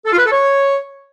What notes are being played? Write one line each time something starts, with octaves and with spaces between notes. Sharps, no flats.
A4
F4
B4
A4
C#5